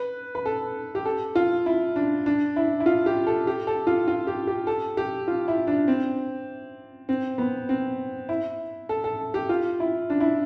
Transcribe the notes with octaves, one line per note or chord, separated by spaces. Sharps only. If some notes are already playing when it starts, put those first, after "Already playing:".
Already playing: B4
B4
A4
G4
A4
F4
E4
D4
D4
E4
E4
F4
G4
A4
G4
A4
F4
F4
G4
G4
A4
G4
F4
E4
D4
C4
C4
B3
C4
E4
A4
A4
G4
F4
E4
D4
E4